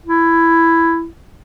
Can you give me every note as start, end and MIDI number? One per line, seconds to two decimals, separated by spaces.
0.06 1.07 64